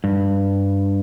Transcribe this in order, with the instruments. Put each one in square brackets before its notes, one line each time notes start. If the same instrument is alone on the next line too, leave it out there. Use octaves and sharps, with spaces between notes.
[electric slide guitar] G2